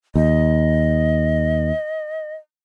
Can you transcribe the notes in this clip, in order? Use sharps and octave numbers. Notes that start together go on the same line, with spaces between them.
D#2 D#5